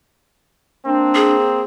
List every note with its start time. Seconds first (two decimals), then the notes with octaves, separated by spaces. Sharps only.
0.86 A#3 C4 D4
1.15 G#4